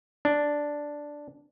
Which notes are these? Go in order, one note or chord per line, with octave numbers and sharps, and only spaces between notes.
D4